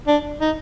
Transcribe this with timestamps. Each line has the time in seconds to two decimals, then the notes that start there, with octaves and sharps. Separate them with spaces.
0.07 D4
0.41 D#4